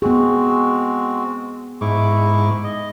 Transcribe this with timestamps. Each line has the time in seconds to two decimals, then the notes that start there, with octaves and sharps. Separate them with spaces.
0.02 G#3 B3 C4 F#4 G#4
1.81 G#2 E4 C#6 D6
2.64 D#5